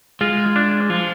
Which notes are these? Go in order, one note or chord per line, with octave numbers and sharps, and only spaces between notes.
G#3 F4
D4
F3 F4